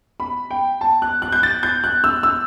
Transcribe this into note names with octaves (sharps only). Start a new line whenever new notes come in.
B5
G5
A5
F#6
F#6
G6
A6
G6
F#6
E6
E6